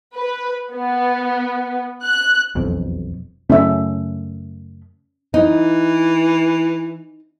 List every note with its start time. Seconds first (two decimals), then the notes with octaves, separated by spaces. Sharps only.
0.16 B4
0.72 B3
2.04 F#6
2.55 E1 B1 F2
3.50 F#2 C#3 A3 C#4 E5
5.34 E3 D#4